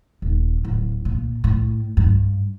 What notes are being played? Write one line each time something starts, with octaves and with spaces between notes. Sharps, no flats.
D#1
D1
A#2
A2
G2